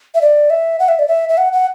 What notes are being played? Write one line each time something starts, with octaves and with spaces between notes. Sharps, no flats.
E5
D5
E5
F#5
E5
D5
E5
E5
F#5
F#5